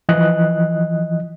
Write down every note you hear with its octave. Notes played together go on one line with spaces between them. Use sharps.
E3 F3 D#5 F#6